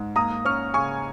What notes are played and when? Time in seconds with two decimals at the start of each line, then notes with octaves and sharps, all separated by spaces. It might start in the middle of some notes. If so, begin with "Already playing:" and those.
Already playing: G#2
0.16 A#3 A#5 D#6
0.45 C#4 C#6 F6
0.74 C#3 G#5 C#6